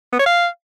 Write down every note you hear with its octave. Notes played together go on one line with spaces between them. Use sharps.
B3
C#5
F5